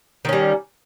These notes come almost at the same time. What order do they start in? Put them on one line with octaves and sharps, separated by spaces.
D#3 C#4 G3